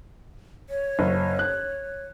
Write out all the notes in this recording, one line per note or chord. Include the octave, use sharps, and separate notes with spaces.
C#5
F#1
F#6